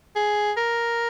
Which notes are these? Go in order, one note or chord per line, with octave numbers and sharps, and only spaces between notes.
G#4
A#4